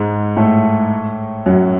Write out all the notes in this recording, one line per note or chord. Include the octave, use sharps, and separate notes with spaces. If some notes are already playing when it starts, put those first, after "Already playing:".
Already playing: G#2 G#3
A2 A3
F#2 F#3